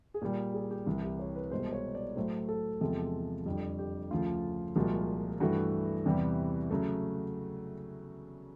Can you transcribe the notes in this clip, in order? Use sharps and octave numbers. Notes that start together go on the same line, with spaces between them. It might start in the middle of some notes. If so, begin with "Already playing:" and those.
G#4
A#2 G3 G4
G#4
G4
C2 C3 E3
G4
C#5
B4
C2 B2 G#3 C5
C#5
D5
A2 F#3 A3 C5
A4
E2 C3 F3 G#3 A4
F2 D3 G3
G4
D2 C#3 F3 F4
C2 A#2 F3 G#3 F#4
G2 E3 A3 F#4
E2 C3 E3 G3
C#3 F#3 A3